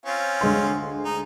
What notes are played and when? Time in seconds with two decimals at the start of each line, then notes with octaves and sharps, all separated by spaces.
0.06 C4 C#4 F4
0.41 D2 G#3 C6
1.05 D#4